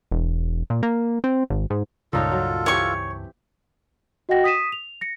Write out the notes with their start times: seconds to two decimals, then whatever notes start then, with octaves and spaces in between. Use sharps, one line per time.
0.12 E1
0.70 A#2
0.83 A#3
1.24 C4
1.50 G#1
1.70 G#2
2.13 C#2 G2 A#2 D#4 F4 A4 C#5 A5
2.32 F#3
2.66 E3 C4 G4 C#5 C#6
4.29 F#4 D#5 F#5 G5 A#6
4.44 D#6 B6 D#7 E7
4.72 F7
5.01 A#6 C#7